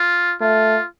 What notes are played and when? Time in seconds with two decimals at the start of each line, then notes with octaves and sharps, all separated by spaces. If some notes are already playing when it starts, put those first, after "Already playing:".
Already playing: F4
0.41 A3 F4